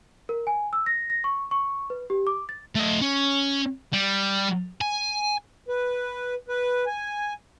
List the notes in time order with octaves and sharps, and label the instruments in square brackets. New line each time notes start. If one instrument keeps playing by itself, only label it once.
[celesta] A#4
G#5
E6
A#6
A#6
C#6
C#6
B4
G4
D6
A6
[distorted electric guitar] A3 D#5
C#4
G3
G#5
[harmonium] B4
B4
G#5